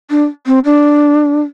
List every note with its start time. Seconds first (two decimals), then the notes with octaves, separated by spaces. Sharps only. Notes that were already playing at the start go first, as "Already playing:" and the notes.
0.10 D4
0.46 C4
0.65 D4